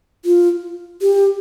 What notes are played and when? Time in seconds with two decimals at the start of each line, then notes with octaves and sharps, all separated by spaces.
0.25 F4
1.01 G4